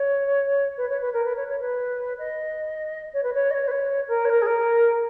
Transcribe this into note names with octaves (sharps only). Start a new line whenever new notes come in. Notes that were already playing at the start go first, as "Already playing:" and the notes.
Already playing: C#5
B4
C#5
B4
A#4
B4
C#5
C#5
B4
D#5
C#5
B4
C#5
D#5
C#5
B4
C#5
A#4
C#5
A#4
G#4
A#4